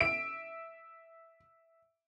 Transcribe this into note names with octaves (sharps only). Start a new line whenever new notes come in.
E5 D7